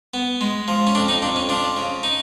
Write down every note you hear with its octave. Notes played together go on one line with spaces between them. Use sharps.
B3
G#3
F3
C#4
F2 D4
D#4
F2 D4
C#4
F3 D4
C#3
D#4